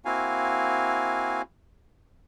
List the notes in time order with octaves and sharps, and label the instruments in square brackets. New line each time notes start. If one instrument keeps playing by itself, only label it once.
[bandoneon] A#3 C4 E4 F#4 F5 G#5